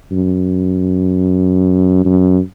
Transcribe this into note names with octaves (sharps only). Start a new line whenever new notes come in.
F#2
F#2